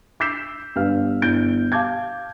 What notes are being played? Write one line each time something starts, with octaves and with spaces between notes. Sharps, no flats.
D6 E6 G6 B6 C7 E7
G1 G2 G4 B4 F5 F6
G1 E4 G6 D7
F5 A5 D6 G6 G#6